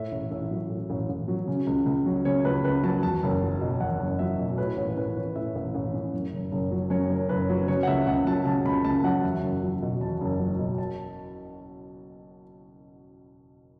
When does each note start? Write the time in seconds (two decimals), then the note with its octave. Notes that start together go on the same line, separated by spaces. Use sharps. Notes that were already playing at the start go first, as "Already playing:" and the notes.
Already playing: A2 E5
0.12 A1
0.31 A1 E5
0.51 F#3
0.70 A2
0.90 A1
1.09 A1
1.28 F#3
1.47 C#3
1.67 C#2
1.86 C#2
2.06 F#3
2.25 C#3 C#5
2.44 C#2 B4
2.64 C#2 B4
2.83 F#3 A5
3.03 E2 A5
3.23 F#1
3.42 F#3
3.61 B2
3.80 E2 F#5
4.00 F#1
4.19 F#3 E5
4.39 B2
4.58 A2 B4
4.77 A1 C#5
4.96 A1 B4
5.17 E3 C#5
5.35 A2 E5
5.55 A1
5.74 A1
5.94 E3
6.13 F#2
6.32 F#1
6.52 F#1
6.71 F#3
6.90 F#2 C#5
7.10 F#1
7.29 F#1 B4
7.50 F#3
7.68 C#3 C#5
7.83 F#5
7.87 C#2 E5
8.07 C#2 F#5
8.27 F#3 A5
8.46 C#3 A5
8.65 C#2 B5
8.85 C#2 A5
9.04 F#3 F#5
9.23 E2 E5
9.42 F#1
9.63 F#3
9.82 B2
10.01 E2 A5
10.21 F#1
10.40 F#3
10.59 B2
10.78 A5